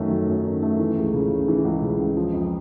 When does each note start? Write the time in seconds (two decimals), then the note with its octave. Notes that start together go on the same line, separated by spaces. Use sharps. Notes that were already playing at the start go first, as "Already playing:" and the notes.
Already playing: F#2 D#3 F#3 A3
0.10 F#3
0.28 F#2
0.45 D#3
0.62 A3
0.79 E3
0.97 C#2
1.14 C#3
1.31 C#2
1.48 E3
1.65 C#2
1.82 C#3
1.99 C#2
2.16 F3
2.34 F2